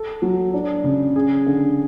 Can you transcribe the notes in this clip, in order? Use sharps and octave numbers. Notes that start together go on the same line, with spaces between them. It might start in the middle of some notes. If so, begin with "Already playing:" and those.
Already playing: A4
F#3
D4
C#3
G#4
D3